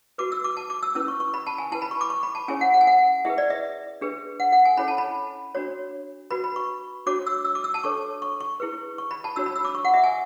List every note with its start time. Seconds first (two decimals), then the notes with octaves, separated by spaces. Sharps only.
0.18 F#4 B4 D6
0.32 E6
0.44 D6
0.57 A5
0.70 D6
0.83 E6
0.95 C#4 E4 B4 E6
1.08 C#6
1.20 C#6
1.34 B5
1.47 A5
1.58 G#5
1.72 E4 B4 A5
1.82 B5
1.91 C#6
2.01 D6
2.10 C#6
2.23 B5
2.35 A5
2.48 C#4 E4 G#4 C#5 G#5
2.61 F#5
2.74 F#5
2.81 G#5
2.87 F#5
3.25 E4 G#4 B4 E5
3.38 D5
3.50 E5
4.01 D4 G#4 B4
4.40 F#5
4.52 F#5
4.65 G#5
4.77 C#4 E4 A4 C#5 B5
4.88 A5
4.98 B5
5.55 D4 F#4 C#5
6.31 F#4 B4 B5
6.44 B5
6.56 C#6
7.06 D4 F#4 C#5 D6
7.27 E6
7.45 E6
7.55 D6
7.64 E6
7.74 A5
7.83 D4 A4 C#5 C#6
8.22 C#6
8.41 C#6
8.60 E4 G#4 B4
8.98 C#6
9.11 B5
9.24 A5
9.36 D4 F#4 C#5 E6
9.46 B5
9.56 E6
9.65 D6
9.75 C#6
9.85 F#5
9.94 E5
10.04 G#5